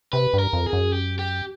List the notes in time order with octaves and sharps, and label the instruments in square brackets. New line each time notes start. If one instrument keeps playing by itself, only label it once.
[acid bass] C3 [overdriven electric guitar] B4
[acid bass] G2
[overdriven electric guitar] A#4
[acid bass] F2
[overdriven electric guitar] G#4
[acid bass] F#2
[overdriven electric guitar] G4
G4